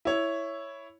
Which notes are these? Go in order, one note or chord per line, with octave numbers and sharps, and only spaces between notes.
E4 C#5